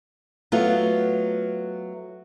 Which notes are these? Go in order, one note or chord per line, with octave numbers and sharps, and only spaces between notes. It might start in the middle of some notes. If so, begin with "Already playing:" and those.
F#3 A3 B3 F4